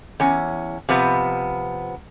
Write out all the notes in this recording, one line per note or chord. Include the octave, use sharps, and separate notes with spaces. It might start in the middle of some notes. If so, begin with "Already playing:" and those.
E2 C#4
C3 F3 B3